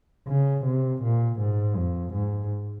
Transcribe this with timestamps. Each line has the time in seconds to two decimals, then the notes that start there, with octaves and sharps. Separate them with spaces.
0.27 C#3
0.65 C3
1.03 A#2
1.40 G#2
1.77 F2
2.14 G#2